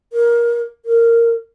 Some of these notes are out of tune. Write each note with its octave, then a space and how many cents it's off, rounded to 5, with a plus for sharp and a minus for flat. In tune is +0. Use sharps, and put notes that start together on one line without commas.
A#4 +20
A#4 -10